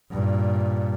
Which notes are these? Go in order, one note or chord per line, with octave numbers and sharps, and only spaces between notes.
G2 A#2